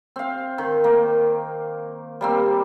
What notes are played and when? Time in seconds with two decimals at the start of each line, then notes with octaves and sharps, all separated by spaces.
0.16 C4 F5
0.58 D#3
0.84 A#3
2.21 G3 A#3 C4